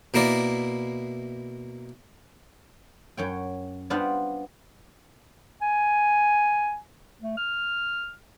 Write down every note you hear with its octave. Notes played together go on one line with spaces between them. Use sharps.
B2 A#3 E4 A#4 D5
F#2 C#5 G5
G3 B3 D4 F4 C5 F5
G#5
A3
F6